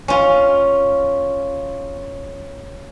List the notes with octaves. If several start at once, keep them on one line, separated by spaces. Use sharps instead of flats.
C#4 F4